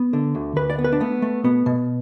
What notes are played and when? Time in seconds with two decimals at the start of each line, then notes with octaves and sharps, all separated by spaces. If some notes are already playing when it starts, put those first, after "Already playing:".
Already playing: B3
0.13 D3
0.35 D2
0.56 D2 B4
0.70 D5
0.79 B3
0.84 B4
0.92 D4
1.00 A3 B3
1.22 A3
1.44 B2 B3
1.66 B2